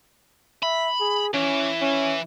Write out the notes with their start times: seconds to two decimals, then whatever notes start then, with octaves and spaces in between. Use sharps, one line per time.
0.63 E5 B5
1.00 G#4
1.34 E3 C#4
1.81 C#4